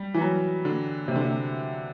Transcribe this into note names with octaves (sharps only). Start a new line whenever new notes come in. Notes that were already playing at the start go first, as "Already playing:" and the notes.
Already playing: G3
E3
F#3
D3
C3
D3
C3